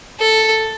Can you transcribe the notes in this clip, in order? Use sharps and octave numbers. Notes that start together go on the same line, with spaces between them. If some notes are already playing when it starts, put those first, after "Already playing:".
A4